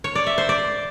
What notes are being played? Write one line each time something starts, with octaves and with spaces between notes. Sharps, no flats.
C#5
D5
E5
C5
D5